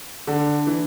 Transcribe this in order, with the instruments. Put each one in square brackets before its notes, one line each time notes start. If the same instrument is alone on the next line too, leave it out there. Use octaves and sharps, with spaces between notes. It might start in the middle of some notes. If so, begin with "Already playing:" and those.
[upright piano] D3 [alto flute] D4
[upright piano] E3